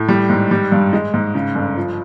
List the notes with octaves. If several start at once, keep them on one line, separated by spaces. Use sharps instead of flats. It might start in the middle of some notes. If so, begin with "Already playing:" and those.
Already playing: A2
G3
G#2
G3
G2
G#3
G#2
C#3
G1
F3